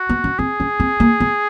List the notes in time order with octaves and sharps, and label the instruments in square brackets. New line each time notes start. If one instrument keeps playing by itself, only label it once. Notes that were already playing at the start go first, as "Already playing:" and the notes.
Already playing: [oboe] F#4
[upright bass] B3
C#4
[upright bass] C4 [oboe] G#4
[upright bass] C#4
C4
A#3
B3